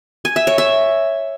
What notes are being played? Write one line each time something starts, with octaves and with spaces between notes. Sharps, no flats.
G#5
E5
C#5
E5